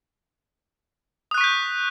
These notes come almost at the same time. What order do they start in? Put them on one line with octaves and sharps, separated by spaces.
D#6 F#6 C#6 B6 G6